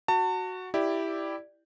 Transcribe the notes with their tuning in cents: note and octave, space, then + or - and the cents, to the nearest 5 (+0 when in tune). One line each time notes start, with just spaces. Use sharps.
F#4 +0 A5 +35
E4 +0 G4 +0 D5 +10